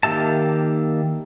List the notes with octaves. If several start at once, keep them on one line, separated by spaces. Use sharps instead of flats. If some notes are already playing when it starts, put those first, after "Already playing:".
D#3 A#3 G4 E5 A5